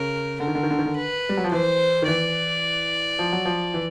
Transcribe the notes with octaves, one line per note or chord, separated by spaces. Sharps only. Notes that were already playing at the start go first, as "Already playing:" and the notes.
Already playing: C#3 A#4
D3 A#4
D#3
D3
D#3
D3
D#3
D3
B4
G3
F#3
F3
E3 C5
D#3
E3 D5
F3
F#3
F3
E3